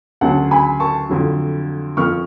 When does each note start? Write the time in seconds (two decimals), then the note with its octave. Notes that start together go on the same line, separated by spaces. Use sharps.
0.21 D2 C#3 F#3 F#5 A5
0.51 G#5 B5
0.80 A5 C#6
1.09 F2 D3 F#3
1.97 F2 F3 C#6 F6